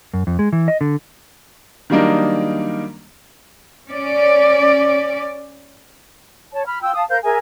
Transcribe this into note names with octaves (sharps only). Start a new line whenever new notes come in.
F#2
F2
G#3
E3
D#5
D3
D#3 F#3 G3 A#3 D4 D#4
C#4 D5
C#5 A5
B5 F6
F4 G5 E6
F5 A5 D#6
A#4 C5 F5 G6
G#4 A#4 E5 G#5